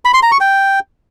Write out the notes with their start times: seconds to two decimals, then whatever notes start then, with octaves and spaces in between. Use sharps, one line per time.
0.05 B5
0.14 C6
0.23 A#5
0.32 C#6
0.40 G5